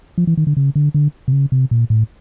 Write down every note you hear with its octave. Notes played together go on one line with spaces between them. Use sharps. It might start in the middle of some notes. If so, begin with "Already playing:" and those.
F3
E3
D#3
D3
C#3
D3
D3
C3
C#3
C3
A#2
A2